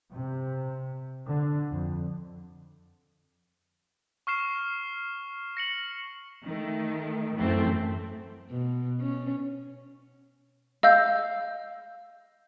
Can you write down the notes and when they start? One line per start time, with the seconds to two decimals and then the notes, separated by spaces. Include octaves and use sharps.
0.11 C3
1.27 D3
1.70 F2
4.27 C#6 F6 C7 E7
5.57 A#6 C#7 F#7
6.45 D#3 A3
7.34 F#2 A2 E3 A3 C4
8.51 B2
9.00 C#4
10.83 D#5 F5 E6 G6